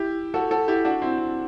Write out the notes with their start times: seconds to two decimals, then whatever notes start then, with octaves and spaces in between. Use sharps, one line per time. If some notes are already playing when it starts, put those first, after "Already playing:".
Already playing: E4 G4
0.34 F#4 A4
0.51 F#4 A4
0.68 E4 G4
0.85 D4 F#4
1.02 C4 E4
1.18 C4